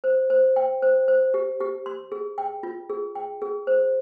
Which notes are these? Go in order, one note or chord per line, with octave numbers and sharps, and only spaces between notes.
C5
C5
G5
C5
C5
G4
G4
C6
G#4
G5
F4
G#4
G5
G#4
C5